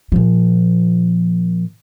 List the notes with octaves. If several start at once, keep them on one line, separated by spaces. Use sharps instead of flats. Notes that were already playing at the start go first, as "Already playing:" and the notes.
A#2 F3